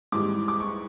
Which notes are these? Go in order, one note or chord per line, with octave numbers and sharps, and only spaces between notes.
G#2 E3 G3 D6
D6
C#6